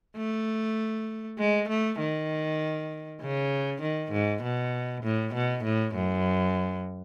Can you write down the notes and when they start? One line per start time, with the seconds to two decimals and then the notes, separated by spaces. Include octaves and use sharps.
0.17 A3
1.39 G#3
1.69 A3
1.99 D#3
3.21 C#3
3.82 D#3
4.12 G#2
4.43 B2
5.04 A2
5.34 B2
5.64 A2
5.95 F#2